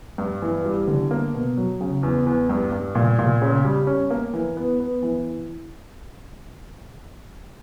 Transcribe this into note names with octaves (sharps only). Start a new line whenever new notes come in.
G2
E3
G3
D3
A#3
B2
F#3
C#3
E2
E2
G2
G2
A#2
A#2
C#3
G3
C#4
A#3
E3
B3
B3
E3